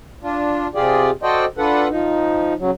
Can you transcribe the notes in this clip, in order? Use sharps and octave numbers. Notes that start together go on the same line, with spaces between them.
D4 F4
C3 F4 G4 G#4 D5
F#4 A4 C5 D5 D#5 G5
D4 F4 A4 B4 F#5
F3 D#4
C#3 F#3